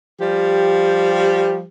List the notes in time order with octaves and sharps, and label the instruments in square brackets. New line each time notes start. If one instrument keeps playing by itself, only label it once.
[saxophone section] F3 G3 G4